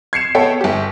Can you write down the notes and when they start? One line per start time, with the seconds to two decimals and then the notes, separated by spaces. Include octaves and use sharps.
0.13 G#6 C7 C#7 E7
0.35 B3 A4 C#5 G5
0.61 G1 G4